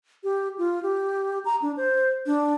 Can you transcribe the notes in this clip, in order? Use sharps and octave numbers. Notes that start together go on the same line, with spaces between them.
G4
F4
G4
A#5
D4
C5
D4